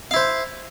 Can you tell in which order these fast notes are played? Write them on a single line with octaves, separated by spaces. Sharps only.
F5 E4 C5